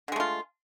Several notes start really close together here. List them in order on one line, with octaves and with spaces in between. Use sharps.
D3 G#3 A3 F4